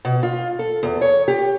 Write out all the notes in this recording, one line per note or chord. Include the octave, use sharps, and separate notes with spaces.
B2
F4
A4
E2
C#5
G4